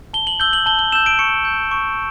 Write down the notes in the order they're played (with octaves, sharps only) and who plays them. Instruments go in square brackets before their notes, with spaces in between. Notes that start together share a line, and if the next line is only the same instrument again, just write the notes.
[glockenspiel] A5 G7
F#7
E6 G6 G7
F#7
A5 G7
G7
E6 G6 E7
D7
C#6 C#7
G6
C#6